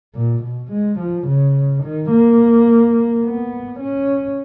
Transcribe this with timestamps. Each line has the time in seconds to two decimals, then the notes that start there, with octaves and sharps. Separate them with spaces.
0.15 A#2
0.43 B2
0.72 G#3
0.99 F3
1.27 C#3
1.83 D#3
2.11 A#3
3.24 B3
3.79 C#4